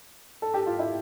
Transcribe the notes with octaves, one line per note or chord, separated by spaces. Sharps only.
A4
G4
F4
E4